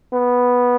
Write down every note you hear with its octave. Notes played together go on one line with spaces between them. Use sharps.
B3